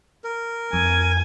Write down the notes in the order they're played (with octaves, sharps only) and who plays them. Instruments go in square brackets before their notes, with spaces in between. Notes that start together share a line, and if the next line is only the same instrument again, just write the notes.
[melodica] A#4
[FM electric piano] F2 [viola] G#5